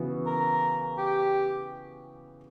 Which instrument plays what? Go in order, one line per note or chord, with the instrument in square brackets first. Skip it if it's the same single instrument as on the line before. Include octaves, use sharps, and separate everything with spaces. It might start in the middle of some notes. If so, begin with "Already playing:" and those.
Already playing: [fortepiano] C#3 E3 B3 F#4
[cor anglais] A#4
G4